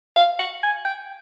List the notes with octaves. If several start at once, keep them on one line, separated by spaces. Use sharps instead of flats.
F5
F#5
G#5
G5